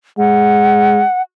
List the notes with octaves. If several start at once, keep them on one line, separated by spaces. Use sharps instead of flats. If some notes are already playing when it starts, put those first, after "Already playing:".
G#3 F#5